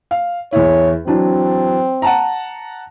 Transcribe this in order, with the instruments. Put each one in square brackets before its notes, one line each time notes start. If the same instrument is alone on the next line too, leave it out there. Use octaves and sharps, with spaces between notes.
[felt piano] F5
[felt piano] E2 E4 [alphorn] C#5
[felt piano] E3 F#3 D4 [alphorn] C4
[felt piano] F#5 A5 A#5